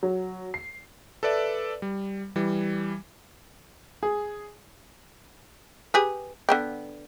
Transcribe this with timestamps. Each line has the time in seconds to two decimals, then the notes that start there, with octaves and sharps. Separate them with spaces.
0.03 F#3
0.54 C7
1.23 A4 B4 D5 E5
1.82 G3
2.36 E3 G3
4.03 G#4
5.94 G4 G#4 B4
6.49 D3 B3 G5